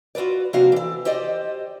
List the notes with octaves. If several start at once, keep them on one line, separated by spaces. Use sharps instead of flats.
F4 F#4 A#4 B4 D5
C3 F3 A#3 D4 F#4 F5
E3 A4
G4 C5 D5 D#5